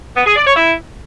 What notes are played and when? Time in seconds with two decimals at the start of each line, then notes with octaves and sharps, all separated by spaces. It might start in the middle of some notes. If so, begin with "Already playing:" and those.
0.15 B3
0.25 G#4
0.35 D5
0.45 C#5
0.55 E4